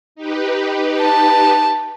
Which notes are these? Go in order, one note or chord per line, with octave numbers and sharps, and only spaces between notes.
D#4 G4 B4
A5